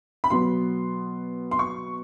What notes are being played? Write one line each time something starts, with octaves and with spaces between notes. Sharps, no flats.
B5
B2 F#3 B3 C6
C6
C#6